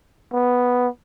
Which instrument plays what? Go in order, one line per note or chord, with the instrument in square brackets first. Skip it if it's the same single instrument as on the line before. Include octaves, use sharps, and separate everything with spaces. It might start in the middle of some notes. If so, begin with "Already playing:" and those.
[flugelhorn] B3